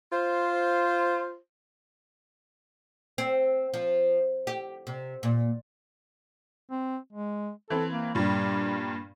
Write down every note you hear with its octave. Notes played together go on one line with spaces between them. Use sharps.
F4 C5
C4
F3
G4
C3
A#2
C4
G#3
E3 C4 A4
A#3
G2 A#2 G3